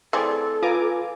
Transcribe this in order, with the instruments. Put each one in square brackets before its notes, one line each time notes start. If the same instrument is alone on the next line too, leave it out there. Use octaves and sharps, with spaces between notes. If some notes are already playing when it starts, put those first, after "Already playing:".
[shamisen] E3 A3 C4 [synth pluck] G#4 D5 [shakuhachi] A4
[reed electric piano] F4 B4 F5 [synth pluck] G#5 A#5 D6